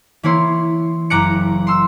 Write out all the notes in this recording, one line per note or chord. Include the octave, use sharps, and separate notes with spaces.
E3 A#3 E4 C#5 C6
F#1 A#5 D6 F#6 C#7
C6 E6